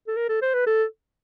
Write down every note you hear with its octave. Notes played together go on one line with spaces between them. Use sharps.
A4
A#4
A4
C5
B4
A4